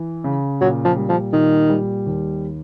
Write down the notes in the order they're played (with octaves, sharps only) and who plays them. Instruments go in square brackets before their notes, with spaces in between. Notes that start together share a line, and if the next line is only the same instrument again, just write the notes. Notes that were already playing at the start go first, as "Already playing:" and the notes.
Already playing: [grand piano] E3
C#3
[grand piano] A#2 [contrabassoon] F#3
[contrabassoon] F3
[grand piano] G3
[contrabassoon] F3
[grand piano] A#2 [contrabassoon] D#3
[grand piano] G3
D#2